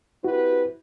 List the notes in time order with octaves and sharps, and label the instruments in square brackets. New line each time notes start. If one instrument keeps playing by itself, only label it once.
[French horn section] C4 G4 B4 [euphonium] E4 [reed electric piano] F#4